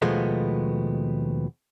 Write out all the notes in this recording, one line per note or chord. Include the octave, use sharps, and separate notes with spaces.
D#2 B2 F3 G#3 A3 B3